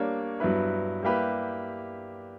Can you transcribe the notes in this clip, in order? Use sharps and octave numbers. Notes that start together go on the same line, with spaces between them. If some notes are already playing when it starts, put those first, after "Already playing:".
Already playing: G3 A#3 D4 A#4 C#5
G2 F#3 B3 E4 B4
G3 A#3 E4 G4 B4